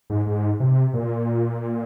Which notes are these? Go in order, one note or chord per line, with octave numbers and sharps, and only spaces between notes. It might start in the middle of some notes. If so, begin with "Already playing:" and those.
G#2
G#2
C3
A#2